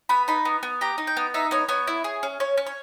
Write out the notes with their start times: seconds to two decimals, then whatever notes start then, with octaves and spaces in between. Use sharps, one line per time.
0.09 B3 B5
0.28 D#4 B5
0.45 B3
0.63 B3
0.81 G4 A#5
0.98 D#4
1.07 G5
1.17 B3
1.34 D#4 E5
1.51 B3 C#5
1.69 B3 C#5
1.87 E4
2.04 G#4
2.23 C#4
2.40 C#4 C#5
2.57 C#4
2.66 C#5